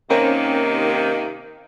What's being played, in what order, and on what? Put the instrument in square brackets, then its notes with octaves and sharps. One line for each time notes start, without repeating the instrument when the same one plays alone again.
[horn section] C3 D#3 A#3 [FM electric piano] C4 C#4 A#4